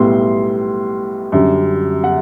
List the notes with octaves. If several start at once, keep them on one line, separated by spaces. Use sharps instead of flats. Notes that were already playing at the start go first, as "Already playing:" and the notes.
Already playing: B1 A2 G3 B3 C6
F#2 D3 G3
F#5